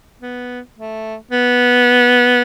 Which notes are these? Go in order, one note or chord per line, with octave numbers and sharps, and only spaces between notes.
B3
A3
B3